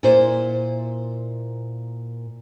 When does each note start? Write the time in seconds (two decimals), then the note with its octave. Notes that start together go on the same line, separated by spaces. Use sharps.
0.03 A#2 E4 C5